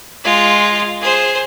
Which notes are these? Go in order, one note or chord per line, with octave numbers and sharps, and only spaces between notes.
G#3 F4
G#4 C5